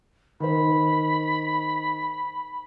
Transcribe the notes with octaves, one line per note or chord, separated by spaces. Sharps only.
D#3 C5 B5